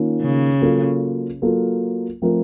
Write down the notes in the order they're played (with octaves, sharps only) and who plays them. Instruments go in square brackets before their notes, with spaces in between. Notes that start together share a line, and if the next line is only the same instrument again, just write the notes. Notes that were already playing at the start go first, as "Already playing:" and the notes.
Already playing: [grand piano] D#3 A#3 C#4 F4
[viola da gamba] C#3
[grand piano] F#3 A#3 F4 A4
F#3 A#3 F4 A4
F3 A3 C4 F4 A#4